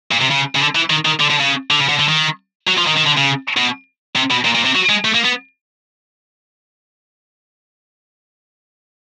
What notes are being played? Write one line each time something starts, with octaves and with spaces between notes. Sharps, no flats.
A#2
C3
C#3
C#3
D3
E3
D#3
D#3
D3
D3
C#3
D3
C#3
D3
D3
D#3
F#3
F3
D#3
D#3
D3
C#3
B2
C3
B2
A#2
A#2
C3
F#3
G#3
A3
A#3
B3